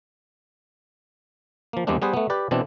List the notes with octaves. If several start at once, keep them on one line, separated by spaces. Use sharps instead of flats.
F3 A#3
E2 G3 G#3 A#3 C4 D4
G3 B3 G#4 B4 C5
A3 B3
G4 B4 D5
B2 E3 C4 D4